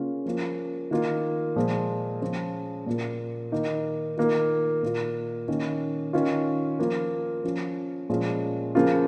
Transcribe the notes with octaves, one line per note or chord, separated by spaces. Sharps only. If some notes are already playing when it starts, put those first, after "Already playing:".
Already playing: C#3 A#3 C#4 F4
F3 A#3 C#4 F4
D#3 A#3 F4
A#2 F3 G#3
C#3 F3 C#4
A#2 A#3 F4
D#3 A#3 D#4
D#3 A#3 F4
A#2 A#3 F4
D#3 A#3 C#4
D#3 C#4 F4
F3 A#3 F4
F3 C#4 F4
A#2 F3 G#3 C#4 F4
C#3 F3 A#3 F4